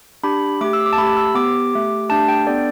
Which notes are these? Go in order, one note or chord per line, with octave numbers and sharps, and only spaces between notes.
D4 G4 B5
A3 G4 D6
E6
D6
A5
A3 G4 B5
E6
B3 G4 D6
A3 G4
A3 D4 G4 A5
G5
B3 D4 A4 D5